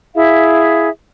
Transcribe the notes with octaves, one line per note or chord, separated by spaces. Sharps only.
E4 G#4 E5 F5